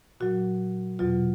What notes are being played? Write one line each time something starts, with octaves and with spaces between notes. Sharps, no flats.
A#2 F#3 F#4
E2 B2 F#3 F4